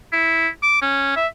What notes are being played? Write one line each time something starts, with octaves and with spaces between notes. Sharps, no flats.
E4
D6
C#4
E5